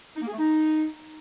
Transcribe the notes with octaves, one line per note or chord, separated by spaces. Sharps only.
D#4
A#3
G#4
A3
D#4